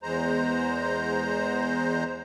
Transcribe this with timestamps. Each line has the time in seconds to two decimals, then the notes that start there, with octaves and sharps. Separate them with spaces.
0.03 E2 G#3 C5 A#5